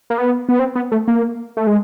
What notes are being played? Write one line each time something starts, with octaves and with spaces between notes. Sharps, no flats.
A#3
B3
B3
C4
B3
A3
A#3
A3
G#3